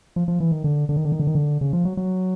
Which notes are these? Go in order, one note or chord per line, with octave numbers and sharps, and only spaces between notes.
F3
F3
E3
D#3
D3
D3
D#3
D3
D#3
D3
D#3
D3
C#3
F3
F#3
F#3